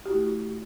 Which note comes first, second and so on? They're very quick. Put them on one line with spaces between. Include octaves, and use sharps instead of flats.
G4 F#4 E4 A3